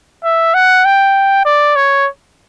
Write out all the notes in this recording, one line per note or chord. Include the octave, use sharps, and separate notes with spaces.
E5
F#5
G5
D5
C#5